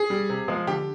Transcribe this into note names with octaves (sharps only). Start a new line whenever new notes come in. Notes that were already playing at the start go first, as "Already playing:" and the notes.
Already playing: G#4
G3
C3
F3 G#3
D3 G4